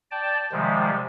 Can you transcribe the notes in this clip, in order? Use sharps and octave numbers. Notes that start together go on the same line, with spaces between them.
D5 G5 A5
C3 D#3 F3 G3 G#3